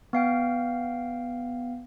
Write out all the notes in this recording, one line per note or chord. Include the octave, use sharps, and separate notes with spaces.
B3 F5 G5